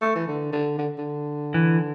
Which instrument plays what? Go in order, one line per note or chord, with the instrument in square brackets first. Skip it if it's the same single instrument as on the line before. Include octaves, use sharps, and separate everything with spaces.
[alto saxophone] A3
E3
D3
D3
D3
D3
[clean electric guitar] E3